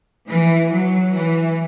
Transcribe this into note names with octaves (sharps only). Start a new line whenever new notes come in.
E3
F#3
E3